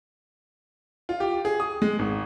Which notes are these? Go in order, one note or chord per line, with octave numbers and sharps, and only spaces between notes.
F4
G4
G#4
D#6
G#3
G#1